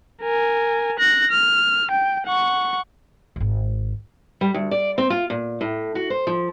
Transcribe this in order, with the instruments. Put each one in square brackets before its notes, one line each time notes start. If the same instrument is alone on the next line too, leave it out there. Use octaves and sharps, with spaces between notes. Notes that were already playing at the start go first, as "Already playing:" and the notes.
[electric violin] A#4 G#5
F#6 A#6
F6
G5
F#5 C#6
[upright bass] D#1 G#1
[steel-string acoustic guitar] G3
D2
D5
C4
F4
A#2
A2
F#4
C5
F3